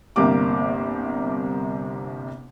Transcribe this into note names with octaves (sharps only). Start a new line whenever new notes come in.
G1 C2 C3 A#3 G4 D6